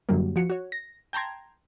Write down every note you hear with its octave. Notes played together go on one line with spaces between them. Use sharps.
F#2 D3 F#3 G3 A#3
F3 F#4 C#7
F#4 C#5
A#6
G5 A5 A#5 C6 G#6